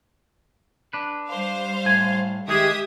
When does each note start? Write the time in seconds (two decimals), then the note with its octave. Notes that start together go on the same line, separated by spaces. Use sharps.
0.93 D4 B4
1.28 G3 C5 F5
1.85 A2 G#5
2.48 D#3 G#3 G4 G#4 E5 D#6